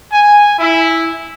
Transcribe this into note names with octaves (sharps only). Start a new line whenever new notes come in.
G#5
E4